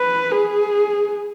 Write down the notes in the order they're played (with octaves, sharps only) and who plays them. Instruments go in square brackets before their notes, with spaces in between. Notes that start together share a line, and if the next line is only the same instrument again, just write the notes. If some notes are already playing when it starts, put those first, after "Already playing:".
Already playing: [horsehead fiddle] B4
G#4